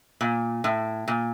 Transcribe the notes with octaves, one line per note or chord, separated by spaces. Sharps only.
A#2
A2
A#2